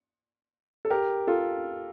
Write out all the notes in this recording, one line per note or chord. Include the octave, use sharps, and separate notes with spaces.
A4
G4 A#4
F4 A4